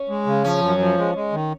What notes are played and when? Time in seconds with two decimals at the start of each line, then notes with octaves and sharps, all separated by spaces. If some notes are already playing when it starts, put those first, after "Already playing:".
Already playing: C#4
0.09 G#3
0.26 C#3
0.44 F3 C#4
0.62 F#2
0.80 F3
0.97 G#3
1.15 G#3
1.32 D#3